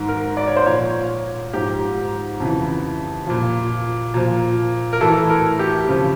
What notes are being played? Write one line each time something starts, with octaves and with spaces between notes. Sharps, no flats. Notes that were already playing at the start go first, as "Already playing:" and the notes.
Already playing: G#2 D#3
A#4
D5
C#5
C5
A#2 F3 C#5
G#2 F3 G4
F2 C#3 E3
A#2 F3
A#2 F3
A#4
A2 E3 A4
A#4
G4
F2 C#3 F3